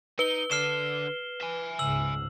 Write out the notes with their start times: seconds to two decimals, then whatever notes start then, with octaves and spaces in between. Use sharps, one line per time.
0.19 D#4 B4 G7
0.51 D3 D4 F6 C7 E7
1.41 E5 G#5
1.79 C#2 G#2 E6 F#7